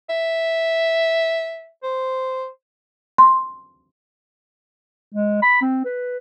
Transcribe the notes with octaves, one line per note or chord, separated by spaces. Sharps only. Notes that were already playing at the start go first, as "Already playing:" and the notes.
E5
C5
C6
G#3
B5
C4
B4